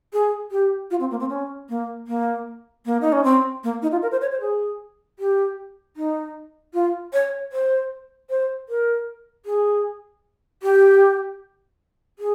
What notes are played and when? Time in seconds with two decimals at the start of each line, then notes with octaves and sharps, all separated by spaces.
0.13 G#4
0.51 G4
0.91 F4
1.00 C4
1.11 A#3
1.20 C4
1.30 C#4
1.69 A#3
2.07 A#3
2.86 A#3
3.01 D#4
3.12 C#4
3.24 C4
3.64 A#3
3.82 D#4
3.92 F4
4.02 A#4
4.12 C5
4.21 C#5
4.31 C5
4.41 G#4
5.19 G4
5.97 D#4
6.74 F4
7.13 C#5
7.52 C5
8.30 C5
8.69 A#4
9.46 G#4
10.63 G4
12.19 G#4